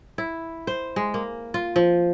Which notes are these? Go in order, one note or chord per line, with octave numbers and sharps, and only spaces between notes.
E4
C5
G#3
A#3
F4
F3